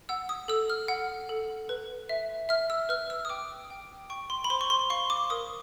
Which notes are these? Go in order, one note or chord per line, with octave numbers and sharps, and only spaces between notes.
F#5 E6
D#6
A4 E6
F6
F#5
A4
B4
E5
E5 F6
E6
B4 F6
E6
D#6
G5 D6
G5
G5 C#6
C6
B5
C5 C6
C#6
C6
F5 C#6
D6
A#4 D#6